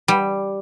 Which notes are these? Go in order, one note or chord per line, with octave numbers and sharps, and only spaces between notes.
G3